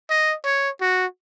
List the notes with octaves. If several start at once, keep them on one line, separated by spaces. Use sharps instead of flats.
D#5
C#5
F#4